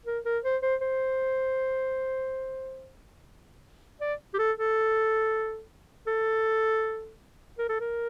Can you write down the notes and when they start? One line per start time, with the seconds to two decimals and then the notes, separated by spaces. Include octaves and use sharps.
0.06 A#4
0.25 A#4
0.44 C5
0.62 C5
0.81 C5
4.01 D5
4.34 G4
4.39 A4
4.57 A4
6.07 A4
7.59 A#4
7.69 A4
7.80 A#4